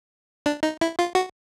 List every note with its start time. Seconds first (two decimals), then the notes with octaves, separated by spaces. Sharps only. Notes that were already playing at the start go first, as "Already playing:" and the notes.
0.46 D4
0.63 D#4
0.81 E4
0.99 F4
1.15 F#4